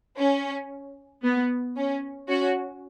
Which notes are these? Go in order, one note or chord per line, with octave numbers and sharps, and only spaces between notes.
C#4
B3
C#4
C#4 F#4